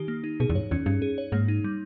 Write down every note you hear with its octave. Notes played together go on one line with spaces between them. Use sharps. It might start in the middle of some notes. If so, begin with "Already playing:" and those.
Already playing: D#3 D#4 G4
A#3
D#4
B2 G#4
E2
G2 C#5
E2 C#4
G2 C#4
G#4
C#5
G#2 A#3
D#4
G3